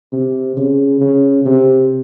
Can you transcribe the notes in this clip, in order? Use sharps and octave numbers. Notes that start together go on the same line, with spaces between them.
C3
C#3
C#3
C3